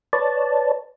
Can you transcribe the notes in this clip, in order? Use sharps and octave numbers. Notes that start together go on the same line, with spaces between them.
B4 C#5 D5 A5